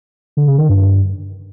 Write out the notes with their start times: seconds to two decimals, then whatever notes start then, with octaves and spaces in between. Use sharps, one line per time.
0.37 D3
0.48 C#3
0.58 D#3
0.69 G2